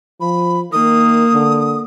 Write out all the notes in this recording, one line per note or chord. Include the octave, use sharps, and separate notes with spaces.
F3 B5
D#3 A#3 D#6
D3